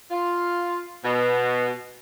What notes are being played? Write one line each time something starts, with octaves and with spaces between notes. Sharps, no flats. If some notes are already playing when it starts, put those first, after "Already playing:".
F4
B2